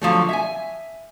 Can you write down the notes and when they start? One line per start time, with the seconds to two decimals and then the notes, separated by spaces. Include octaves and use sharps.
0.02 D3 F3 F#3 A3
0.29 E5 G#5